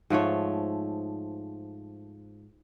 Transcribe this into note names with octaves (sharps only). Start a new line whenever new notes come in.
G#2 F3 A3 C#5